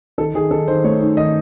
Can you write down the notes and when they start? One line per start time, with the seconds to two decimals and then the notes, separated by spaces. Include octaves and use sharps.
0.18 D#3 A4
0.34 D#3 G#4
0.51 D#3 A4
0.68 D#3 C5
0.84 A3 C#5
1.00 D#4
1.17 D#3 D#5